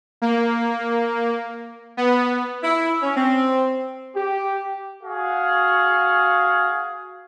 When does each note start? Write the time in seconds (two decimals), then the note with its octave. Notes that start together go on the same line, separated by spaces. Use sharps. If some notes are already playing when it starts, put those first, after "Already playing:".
0.22 A#3
1.97 B3
2.62 E4
3.02 C#4
3.17 C4
4.16 G4
5.03 F#4 G#4 F5